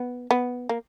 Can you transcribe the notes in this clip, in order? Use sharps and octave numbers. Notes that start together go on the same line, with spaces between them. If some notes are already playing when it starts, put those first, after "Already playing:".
Already playing: B3
B3
A#3